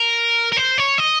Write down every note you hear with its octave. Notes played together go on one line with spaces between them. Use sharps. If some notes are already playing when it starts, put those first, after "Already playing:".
Already playing: A#4
A#4
C5
C#5
D#5